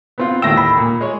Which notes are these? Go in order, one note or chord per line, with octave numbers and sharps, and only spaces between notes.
B3 C4 F4
D#2 A2 G5 E6 A#6
B5
A#2
G#3 C#5